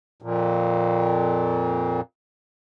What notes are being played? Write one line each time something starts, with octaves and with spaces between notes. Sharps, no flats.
F2 A#2